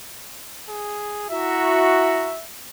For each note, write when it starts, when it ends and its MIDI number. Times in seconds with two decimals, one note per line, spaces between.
0.68 1.26 68
1.30 2.33 64
1.30 2.33 66
1.30 2.42 76
1.30 2.33 82